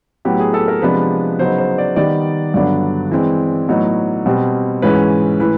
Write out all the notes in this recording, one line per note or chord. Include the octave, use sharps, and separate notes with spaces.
A2 F#3 B3 G4
G#4
A4
A#4
C3 F3 G#3 B3 D4 B4
C#3 F#3 B3 D#4 C5
C5
D5
D#3 G3 B3 D#4 D5
G2 D3 F#3 B3 D4 D5
E3 G#3 C4
A2 F#3 B3 D#4
B2 G3 C4
G#2 E3 G#3 C#4 B4
A2 E3 B4